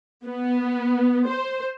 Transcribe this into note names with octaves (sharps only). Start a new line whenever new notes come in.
B3
C5